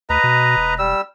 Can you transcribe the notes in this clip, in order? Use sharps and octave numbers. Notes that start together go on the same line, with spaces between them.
D2 B4 D#5 A#5
B2
E1
G3 E6